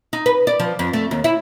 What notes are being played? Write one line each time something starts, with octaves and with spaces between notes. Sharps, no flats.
D#4
B4
D5
F3
F2
A3
D#2
E4